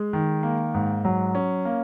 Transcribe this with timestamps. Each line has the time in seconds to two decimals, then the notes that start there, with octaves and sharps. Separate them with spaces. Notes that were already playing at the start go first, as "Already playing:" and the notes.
Already playing: G#3
0.13 D#3
0.43 A#3
0.74 G#2
1.05 F#3
1.35 C#4
1.65 A#3